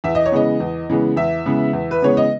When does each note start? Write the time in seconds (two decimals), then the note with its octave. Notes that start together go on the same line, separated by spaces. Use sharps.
0.04 E2 E5
0.15 D#5
0.26 C#5
0.32 C#3 E3 G#3 B3 D#5
0.60 E2
0.89 C#3 E3 G#3 B3
1.17 E2 E5
1.46 C#3 E3 G#3 B3
1.73 E2
1.91 B4
2.02 C#3 E3 G#3 B3 C#5
2.17 D#5